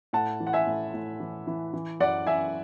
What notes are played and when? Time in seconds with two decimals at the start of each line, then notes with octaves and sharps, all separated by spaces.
0.13 A2 F#5 A5
0.40 E3
0.47 F#5
0.53 E5 G#5
0.67 A2
0.94 A2
1.20 E3
1.47 E3
1.74 E3
2.00 F#2 D5 F#5
2.26 E3 E5 G#5